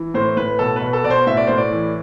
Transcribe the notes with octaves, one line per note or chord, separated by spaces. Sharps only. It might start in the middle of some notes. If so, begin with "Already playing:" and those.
Already playing: E3
A2 C5
A2 B4
B2 A4
B4
B2
A4
B2 D5
C5
A2 E5
D5
A2 C5
D5
E3